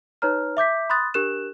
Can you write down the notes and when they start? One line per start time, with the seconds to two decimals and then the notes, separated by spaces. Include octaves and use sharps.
0.22 D#4 B4 C#5 A#5 F6
0.57 E5 D6 G6 B6
0.90 B5 C6 D#6 F#6 A6
1.14 D4 G4 A#4 F#6 E7